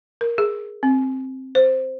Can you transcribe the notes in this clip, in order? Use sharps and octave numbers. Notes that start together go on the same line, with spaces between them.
A#4
G#4
C4
C5